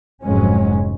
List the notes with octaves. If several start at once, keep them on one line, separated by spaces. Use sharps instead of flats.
F1 F2 G#2 F#3 G#3 C#4